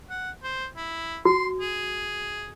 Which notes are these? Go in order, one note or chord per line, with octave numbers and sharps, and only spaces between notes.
F#5
C5
E4
F#4 C6
G#4